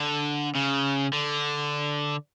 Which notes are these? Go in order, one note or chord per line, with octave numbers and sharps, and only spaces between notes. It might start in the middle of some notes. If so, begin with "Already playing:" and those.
Already playing: D3
C#3
D3